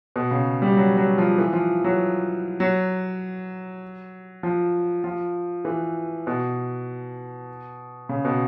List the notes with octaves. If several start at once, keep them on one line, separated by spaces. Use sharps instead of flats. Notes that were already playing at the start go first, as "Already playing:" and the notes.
B2
C#3
G3
F#3
F#3
F3
E3
F3
F#3
F#3
F3
F3
E3
B2
C#3
B2